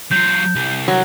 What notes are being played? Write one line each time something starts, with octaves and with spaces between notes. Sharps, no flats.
F#3 F4 G6
C2
F#3